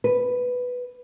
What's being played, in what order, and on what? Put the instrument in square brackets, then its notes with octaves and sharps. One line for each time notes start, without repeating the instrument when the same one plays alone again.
[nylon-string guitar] B4